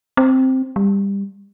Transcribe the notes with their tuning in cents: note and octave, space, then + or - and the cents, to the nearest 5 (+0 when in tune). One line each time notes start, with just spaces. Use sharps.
C4 +0
G3 +20